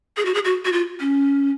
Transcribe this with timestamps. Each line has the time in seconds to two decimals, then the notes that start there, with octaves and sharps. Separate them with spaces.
0.17 G#4
0.25 F#4
0.34 G#4
0.45 F#4
0.65 F#4
0.72 F4
1.00 C#4